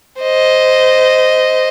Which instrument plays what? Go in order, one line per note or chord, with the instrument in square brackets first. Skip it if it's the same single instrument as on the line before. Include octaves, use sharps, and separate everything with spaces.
[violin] C5 D#5